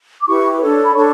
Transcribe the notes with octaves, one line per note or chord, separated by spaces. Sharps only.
D6
E4 G4 B4 C#6
D4 A4 C#5
B5
D4 A4 C#5 C#6